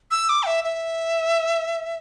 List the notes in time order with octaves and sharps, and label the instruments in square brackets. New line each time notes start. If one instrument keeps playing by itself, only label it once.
[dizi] E6
D6
G5
E5
E5